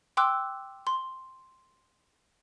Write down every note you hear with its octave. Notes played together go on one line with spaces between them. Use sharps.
G5 C6 D6 E6 F#6
C6